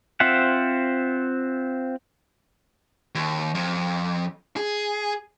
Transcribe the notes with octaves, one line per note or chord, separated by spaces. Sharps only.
C4 F4 C5 E5 F#5
D#2
F2
G#4